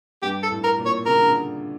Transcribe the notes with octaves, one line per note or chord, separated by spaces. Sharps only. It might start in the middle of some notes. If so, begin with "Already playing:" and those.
G2 G4
A4
A2
A#4
A#2
C#5
C#3 A#4
D3
C#3